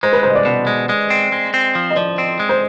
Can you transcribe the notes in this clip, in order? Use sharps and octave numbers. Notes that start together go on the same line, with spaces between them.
G#3 C5
B4
C2 C5
D#5
D5
B2
G#3
G#3
C4
G#3
C4
F3
D#5
F3 D5
C4
G#3
C5